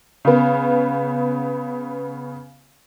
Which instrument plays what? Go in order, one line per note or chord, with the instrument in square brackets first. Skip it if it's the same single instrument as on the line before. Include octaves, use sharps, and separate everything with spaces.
[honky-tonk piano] C#3 B3